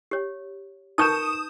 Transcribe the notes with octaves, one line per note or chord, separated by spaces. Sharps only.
G4 C#5
D#4 A#4 B4 A5 C#6 D#6 G6 E7